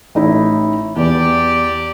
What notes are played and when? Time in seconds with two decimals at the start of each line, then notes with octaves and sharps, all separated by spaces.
0.15 A1 D#4 E4
0.96 E2 G4 D5